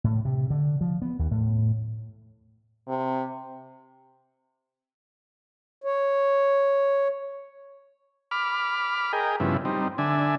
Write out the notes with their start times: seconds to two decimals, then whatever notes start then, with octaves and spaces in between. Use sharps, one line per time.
0.04 A2
0.25 C3
0.50 D3
0.81 F3
1.02 B3
1.19 D#2
1.31 A2
2.88 C3
5.84 C#5
8.31 B5 D6 F6
9.13 G#4 A#4 D#5 G5
9.40 G2 C#3 F3 B3 E4
9.65 G3 C4 D#4
9.98 D3 D4 E5 G#5